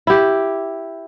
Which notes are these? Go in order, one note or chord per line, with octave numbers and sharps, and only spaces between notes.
E4 G4